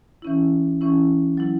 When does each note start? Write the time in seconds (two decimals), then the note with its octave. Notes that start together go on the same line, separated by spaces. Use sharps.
0.22 E3 C#4 E4
0.81 E3 C#4 E4
1.37 F#3 E4